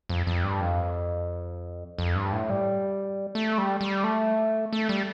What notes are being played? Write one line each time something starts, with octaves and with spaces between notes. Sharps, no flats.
F2
F2
G2
F2
F2
G2
A2
G3
A3
G3
G3
A3
A3
G3